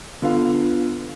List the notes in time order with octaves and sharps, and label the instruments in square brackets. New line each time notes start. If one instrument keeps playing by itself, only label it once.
[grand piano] D3 F5 [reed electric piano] B3 F4 B4